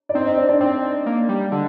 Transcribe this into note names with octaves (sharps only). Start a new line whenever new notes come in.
D5
C4 D#4 D#5
D#4 D#5
D4 D5
D4 D5
C4 D4 D5
A#3
G3
D3